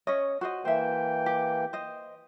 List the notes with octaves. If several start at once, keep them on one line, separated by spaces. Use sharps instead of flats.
C#4 C#5 D#5
F#4 C5 D#5
E3 A#3 C5 E5 G5
G4
C5 D#5